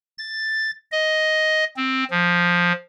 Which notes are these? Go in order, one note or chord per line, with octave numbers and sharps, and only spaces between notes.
A6
D#5
C4
F3